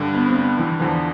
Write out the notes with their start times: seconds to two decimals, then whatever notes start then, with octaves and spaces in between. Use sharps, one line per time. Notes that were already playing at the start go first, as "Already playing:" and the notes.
Already playing: G2 D3 G3
0.14 B3
0.27 C4
0.36 B3
0.58 E3
0.79 E2 D3 E3 F3